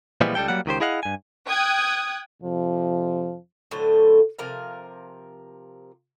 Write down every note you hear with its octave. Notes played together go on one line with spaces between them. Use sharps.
A#2 E3 F3 G3 G#3 B3
C#2 G3 G#4 A4 G5
F#3 G3 A#3 F#5
C#2 D#3 G4 C5
E4 G#4 D#5 F5 F#5
G2 G#5
G5 D#6 F#6 G#6
F2 C3 F3
A2 D3 F#3 C5
C3 F3 A#4 F5